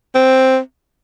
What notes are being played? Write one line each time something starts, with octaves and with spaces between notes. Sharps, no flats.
C4